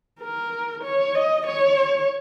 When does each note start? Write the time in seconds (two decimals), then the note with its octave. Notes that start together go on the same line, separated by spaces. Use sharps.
0.20 A#4
0.83 C#5
1.14 D#5
1.46 C#5